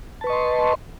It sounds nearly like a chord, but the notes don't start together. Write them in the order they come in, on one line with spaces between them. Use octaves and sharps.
A5 B4 C#6 D#5 C6